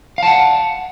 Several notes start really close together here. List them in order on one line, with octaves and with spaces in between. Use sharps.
F5 A5 F#5